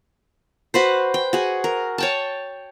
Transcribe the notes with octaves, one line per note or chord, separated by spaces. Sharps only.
F#4 B4 C5
G5
F#4 G#4
A#4
C#5 G5 A5